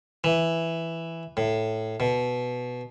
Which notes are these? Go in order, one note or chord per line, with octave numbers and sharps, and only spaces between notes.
E3
A2
B2